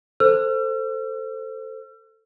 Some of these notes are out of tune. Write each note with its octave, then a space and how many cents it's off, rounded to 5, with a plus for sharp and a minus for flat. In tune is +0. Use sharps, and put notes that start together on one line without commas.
A4 +15 C5 +0 E6 +45